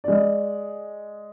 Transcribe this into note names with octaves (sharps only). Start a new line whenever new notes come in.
G#3 D5